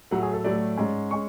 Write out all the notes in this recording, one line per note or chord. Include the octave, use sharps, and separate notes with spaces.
A2 F#3 A3 F#5
G#4
A4
A2 F#3 A3 D5
G#2 G#3 C#4
G#3 C#4 C#6